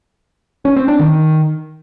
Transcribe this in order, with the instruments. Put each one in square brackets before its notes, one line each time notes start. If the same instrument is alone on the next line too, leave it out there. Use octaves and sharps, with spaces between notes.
[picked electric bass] C#4
C4
D4
D#3